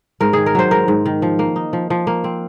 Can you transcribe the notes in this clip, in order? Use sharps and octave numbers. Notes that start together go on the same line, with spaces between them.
G#2 A#4
D#3 G#4
A#4
F#3 C5
G#2 A#4
G#2
D#3
F3
A#3
D#4
F3
F3
A#3
C4